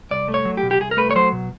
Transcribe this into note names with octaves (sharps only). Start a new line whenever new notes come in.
C2 D5
A3
C#5
F#3
G4
B2
G4
C2 G#4
A#4
A3 B4
C#5
F#3 C5
B2